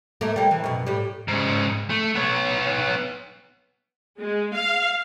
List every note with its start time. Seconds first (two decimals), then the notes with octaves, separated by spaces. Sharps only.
0.21 A3 A#3
0.36 G3 A#3
0.51 E3
0.64 F#2 B2
0.87 A2 G3
1.28 G#2 C#3
1.90 A3
2.15 B3 C#5
4.19 G#3
4.55 F5